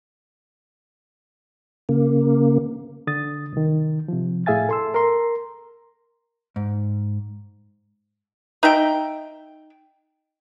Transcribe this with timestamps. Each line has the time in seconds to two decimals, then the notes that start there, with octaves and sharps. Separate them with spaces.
1.89 C#3 A#3
3.07 D3 D#6 A6
3.53 C2 D#3
4.08 C3 F3
4.46 A2 G#4 E5 F5 G#5 A6
4.69 A4 C6 E6
4.94 A#4 A#5 C6
6.56 G#2
8.63 D#4 E5 G5